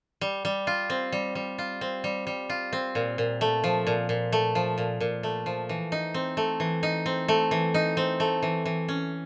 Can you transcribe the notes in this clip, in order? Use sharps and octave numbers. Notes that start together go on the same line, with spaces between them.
G3
G3
F4
C4
G3
G3
F4
C4
G3
G3
F4
C4
A#2
A#2
A3
F3
A#2
A#2
A3
F3
A#2
A#2
A3
F3
E3
D#4
C4
A3
E3
D#4
C4
A3
E3
D#4
C4
A3
E3
E3
C#4